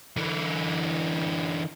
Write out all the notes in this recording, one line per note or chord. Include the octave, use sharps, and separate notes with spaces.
D3 E3